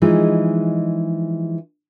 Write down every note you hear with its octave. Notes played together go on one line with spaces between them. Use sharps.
E3 F3 G#3 D#4